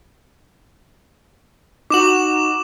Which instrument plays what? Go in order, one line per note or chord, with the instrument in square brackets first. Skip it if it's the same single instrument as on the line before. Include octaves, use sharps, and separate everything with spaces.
[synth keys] D#4 F#4 [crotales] D6 E7 F#7